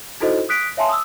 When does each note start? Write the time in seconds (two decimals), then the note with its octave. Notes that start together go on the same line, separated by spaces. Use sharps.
0.20 D#4 E4 F#4 A4 C5 D#5
0.49 D#6 F#6 B6 D7
0.77 C#5 E5 F5 G#5 A5 C6
0.89 D#6 E6